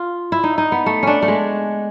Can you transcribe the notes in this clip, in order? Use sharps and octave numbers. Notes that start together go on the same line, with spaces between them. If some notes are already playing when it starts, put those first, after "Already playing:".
Already playing: F4
E4
D#4
D#4
B3
A3
C#4 D4
A3
G#3